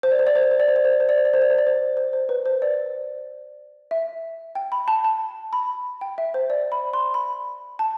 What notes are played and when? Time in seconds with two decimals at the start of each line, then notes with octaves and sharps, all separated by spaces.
0.03 C5
0.11 D5
0.19 C5
0.27 D5
0.35 C5
0.43 D5
0.51 C5
0.60 D5
0.68 C5
0.76 D5
0.85 C5
0.93 D5
1.00 C5
1.09 D5
1.18 C5
1.25 D5
1.34 C5
1.42 D5
1.50 C5
1.58 D5
1.67 C5
1.97 C5
2.13 C5
2.29 B4
2.46 C5
2.62 D5
3.91 E5
4.55 G5
4.72 B5
4.88 A5
5.04 A5
5.53 B5
6.01 G5
6.18 E5
6.34 C5
6.50 D5
6.72 B5
6.93 C6
7.14 B5
7.79 A5